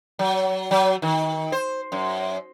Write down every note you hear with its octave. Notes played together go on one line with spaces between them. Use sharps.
F#3
F#3
D#3
C5
F#2